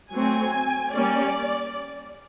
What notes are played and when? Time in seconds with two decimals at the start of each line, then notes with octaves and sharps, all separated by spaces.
0.12 F#3 A3 C4 G#5
0.93 G3 A#3 C#4 D5